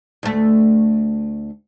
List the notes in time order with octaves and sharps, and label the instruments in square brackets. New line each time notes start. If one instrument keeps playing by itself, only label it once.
[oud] D2 A3